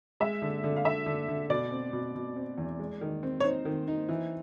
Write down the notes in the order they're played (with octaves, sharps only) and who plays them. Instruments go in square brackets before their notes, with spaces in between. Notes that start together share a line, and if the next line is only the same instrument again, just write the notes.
[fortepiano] G#3 [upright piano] E5
[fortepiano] D3
D3
[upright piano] F5
[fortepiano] D3 [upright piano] E5
[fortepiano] D3
D3
[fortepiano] B2 [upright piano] D5
[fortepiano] C4
B2
B2
C4
E2
G#3
D#3
C4
[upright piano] C#5
[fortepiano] D#4 [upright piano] C5
[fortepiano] D#3
D#4
E3